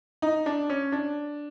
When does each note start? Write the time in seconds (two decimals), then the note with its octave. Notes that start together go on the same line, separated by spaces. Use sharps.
0.22 D#4
0.46 D4
0.69 C#4
0.92 D4